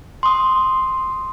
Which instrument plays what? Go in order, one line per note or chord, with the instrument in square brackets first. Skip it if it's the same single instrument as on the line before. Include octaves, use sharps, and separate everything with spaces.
[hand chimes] C6 D#6